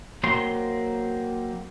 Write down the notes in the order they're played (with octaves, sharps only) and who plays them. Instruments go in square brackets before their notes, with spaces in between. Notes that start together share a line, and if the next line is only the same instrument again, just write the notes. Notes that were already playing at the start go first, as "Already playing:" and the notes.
[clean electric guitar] F#3 A#3 C4 C6